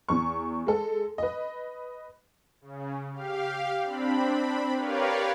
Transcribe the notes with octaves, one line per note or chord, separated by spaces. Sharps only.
E2 C#6
G#3 A4
B4 D#5
C#3
G4 F5
C4 D4 B5
G4 A#4 B4 C#5 D5 F5